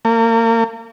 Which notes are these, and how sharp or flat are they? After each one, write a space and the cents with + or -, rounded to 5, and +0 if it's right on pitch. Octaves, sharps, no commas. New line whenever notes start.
A#3 -35